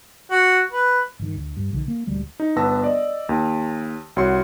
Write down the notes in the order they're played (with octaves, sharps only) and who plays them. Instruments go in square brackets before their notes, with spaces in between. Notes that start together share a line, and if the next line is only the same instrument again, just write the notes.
[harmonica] F#4
B4
[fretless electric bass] G1 D#3
D2
G2
B1 D3 D#3
A#3
D#1 D2 G3 G#3
[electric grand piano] D#4
G1 B3 B4 A5 E6 A#6
D5 D#5
D#2
C2 F#4 C#5 C6 C#7